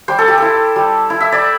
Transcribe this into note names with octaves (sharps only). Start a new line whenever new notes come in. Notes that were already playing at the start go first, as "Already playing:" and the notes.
G3 C5
A4
G4
E4 A4
G3
E4
E5
D5